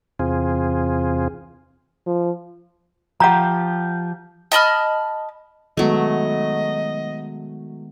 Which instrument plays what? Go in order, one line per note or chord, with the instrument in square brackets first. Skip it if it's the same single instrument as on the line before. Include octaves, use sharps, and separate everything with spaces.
[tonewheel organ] E2 C3 C4 F4 G#4
[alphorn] F3
[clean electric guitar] F3 G4 [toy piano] F#5 A#5
[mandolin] D#5 A5 B5 F6
[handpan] D#3 G#3 B3 [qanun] F#3 A3 [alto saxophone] D#5